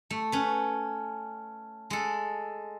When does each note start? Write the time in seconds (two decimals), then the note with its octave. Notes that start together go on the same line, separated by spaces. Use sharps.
0.10 A3
0.32 C#4 B4
1.90 G#3 A4